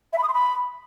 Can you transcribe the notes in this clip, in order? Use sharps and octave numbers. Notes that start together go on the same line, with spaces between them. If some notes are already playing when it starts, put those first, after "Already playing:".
E5
B5
D#6
C6
B5